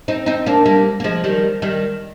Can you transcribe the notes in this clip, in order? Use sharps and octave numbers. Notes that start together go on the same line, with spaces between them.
C4 D#4
C4 D#4
A#3 D4
G3 A#3
A#3
F3 G#3
D#3 G3
D#3 G3